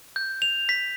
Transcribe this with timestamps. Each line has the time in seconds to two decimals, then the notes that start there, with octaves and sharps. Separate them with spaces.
0.16 G6
0.42 F7
0.69 B6